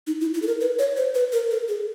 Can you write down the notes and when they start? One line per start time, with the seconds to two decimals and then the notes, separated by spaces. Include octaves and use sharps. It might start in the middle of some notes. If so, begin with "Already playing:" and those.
0.07 D#4
0.21 E4
0.34 E4
0.42 A4
0.47 A#4
0.61 B4
0.79 C#5
0.97 C5
1.15 B4
1.32 A#4
1.51 A4
1.68 G#4